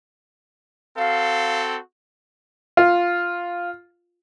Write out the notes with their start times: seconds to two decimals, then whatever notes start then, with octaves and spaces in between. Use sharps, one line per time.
0.98 C4 F#4 A4 F5
2.77 F4